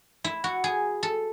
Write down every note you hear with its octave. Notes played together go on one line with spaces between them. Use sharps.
E4
F#4
G#4
A4